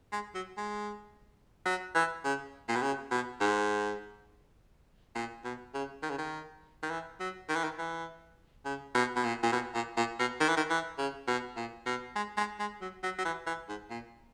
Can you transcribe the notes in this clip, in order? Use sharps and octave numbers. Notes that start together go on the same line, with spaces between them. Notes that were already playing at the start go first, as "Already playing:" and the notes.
G#3
F#3
G#3
F#3
E3
C#3
A#2
B2
C#3
B2
G#2
A#2
B2
C#3
D#3
C#3
D#3
D#3
E3
F#3
D#3
E3
D#3
E3
C#3
B2
B2
A#2
A#2
B2
A#2
A#2
B2
D#3
E3
D#3
E3
C#3
B2
A#2
B2
G#3
G#3
G#3
F#3
F#3
F#3
E3
E3
G#2
A#2